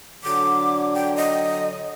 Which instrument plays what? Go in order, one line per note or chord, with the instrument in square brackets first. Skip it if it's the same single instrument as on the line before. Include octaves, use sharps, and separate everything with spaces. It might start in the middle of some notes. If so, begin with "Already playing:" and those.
[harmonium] D3 F#3 [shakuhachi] D6
[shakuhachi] G5
D#5